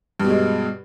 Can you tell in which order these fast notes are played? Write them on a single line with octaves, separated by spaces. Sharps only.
G2 B2 G#3